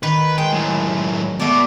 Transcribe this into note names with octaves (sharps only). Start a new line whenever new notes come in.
D#3 B4
G#3 G5
F#2 A2
B2 A3 D5